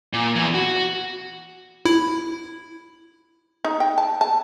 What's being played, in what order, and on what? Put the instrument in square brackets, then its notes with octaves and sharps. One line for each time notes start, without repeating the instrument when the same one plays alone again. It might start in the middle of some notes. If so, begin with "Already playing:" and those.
[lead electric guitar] A#2
E2 E3
F#4
[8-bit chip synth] E4
[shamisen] D#4
G5
A5
A5